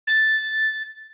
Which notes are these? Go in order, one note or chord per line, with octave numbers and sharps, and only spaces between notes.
A6